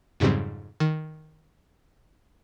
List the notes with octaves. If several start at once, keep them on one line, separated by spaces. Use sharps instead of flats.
F2 G#2 C#3 F#3 G3 C4
D#3